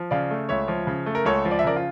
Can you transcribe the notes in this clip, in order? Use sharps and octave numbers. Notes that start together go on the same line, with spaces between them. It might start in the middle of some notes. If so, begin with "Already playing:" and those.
Already playing: F3
C#3 D5 F5
A3
C#2 C#5 E5
F3
C#3
A3
A#4
C#2 A4 C#5
F3
D5
E5
C#3 A#4 D5
F4